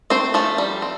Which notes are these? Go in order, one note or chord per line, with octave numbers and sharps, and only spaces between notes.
A3 C4 C5
F3 A3 A4
G3
C4